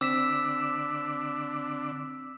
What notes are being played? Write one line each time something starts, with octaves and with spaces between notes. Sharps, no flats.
D3 C4 D4 D6 E6 B6 E7